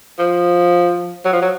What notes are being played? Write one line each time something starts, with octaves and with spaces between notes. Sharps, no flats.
F3
F#3
F3
F#3